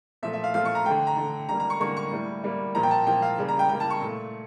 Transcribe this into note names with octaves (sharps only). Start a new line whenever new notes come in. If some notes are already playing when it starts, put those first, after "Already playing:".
A#2 F3 A3 E5
E5
F5
A#2 F3 A3 F5
C#6
A#5
D3 A3 G5
A#5
D3 A3
D3 G3 A#3 A#5
A#5
C#6
D3 G3 A#3 C#6
C#6
A2 G3 A#3
A2 G3 A#3
A#2 F3 A#3 A#5
G5
A5
A#2 F3 A#3 G5
F5
C#3 G3 A#3
A#5
G5
C#3 G3 A#3 G5
A5
C#6
A#2 A3